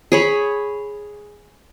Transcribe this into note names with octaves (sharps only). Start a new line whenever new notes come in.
G#4 C#5 B5